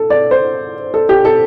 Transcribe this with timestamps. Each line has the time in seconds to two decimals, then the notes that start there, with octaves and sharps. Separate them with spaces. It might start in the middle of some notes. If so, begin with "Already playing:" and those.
Already playing: A4
0.10 D5
0.31 C5
0.94 A4
1.09 G4
1.25 A4